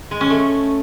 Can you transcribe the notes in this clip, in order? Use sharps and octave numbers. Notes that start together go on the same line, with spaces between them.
G#3
C#4
A3